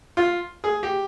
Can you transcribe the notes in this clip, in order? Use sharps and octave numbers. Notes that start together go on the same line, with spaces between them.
F4
G#4
G4